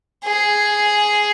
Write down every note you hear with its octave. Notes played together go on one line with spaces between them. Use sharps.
G#4